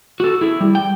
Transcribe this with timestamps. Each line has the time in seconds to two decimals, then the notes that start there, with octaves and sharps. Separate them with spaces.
0.20 F#4 A4
0.41 E4 G#4
0.61 G3
0.75 G5